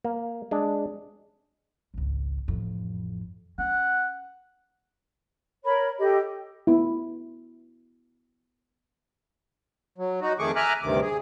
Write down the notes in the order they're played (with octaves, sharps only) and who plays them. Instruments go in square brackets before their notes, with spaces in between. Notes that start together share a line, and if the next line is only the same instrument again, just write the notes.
[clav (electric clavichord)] A#3
G#3 D4
[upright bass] G#1 C#2
A1 F2
[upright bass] C#4 [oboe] F#5
[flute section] A#4 C#5 B5
G4 A4 D#5
[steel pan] B3 E4
[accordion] F#3
D#4 F#4
F2 D#3 A3 G#4 C#6 D6
E5 G#5 A#5 D6 F6 F#6
D2 G2 C3 D#3 D6
G#4